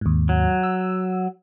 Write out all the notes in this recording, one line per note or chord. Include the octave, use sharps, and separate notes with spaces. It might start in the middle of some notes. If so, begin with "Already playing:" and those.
D#2 G#2
F#3
E6